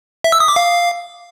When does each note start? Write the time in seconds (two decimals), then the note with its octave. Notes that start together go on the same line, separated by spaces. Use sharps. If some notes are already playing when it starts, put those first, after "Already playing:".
0.24 E5
0.32 E6
0.40 D#6
0.48 D6
0.56 F5